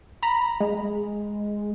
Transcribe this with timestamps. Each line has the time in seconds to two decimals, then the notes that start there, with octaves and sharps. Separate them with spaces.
0.23 A#5 B5
0.60 G#3